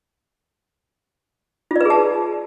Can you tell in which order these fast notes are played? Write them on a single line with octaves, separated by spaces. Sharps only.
F4 D5 B4 G#4 A5